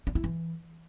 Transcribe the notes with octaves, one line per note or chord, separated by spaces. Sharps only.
D4
E4
E3